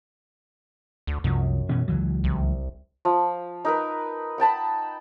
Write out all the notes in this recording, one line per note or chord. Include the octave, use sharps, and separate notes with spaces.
D2
C2 F#2 F3
B2 E3 C#4
C#2 E3 F#3
C2
F3
D#4 A#4 B4
F#5 G5 A5 B5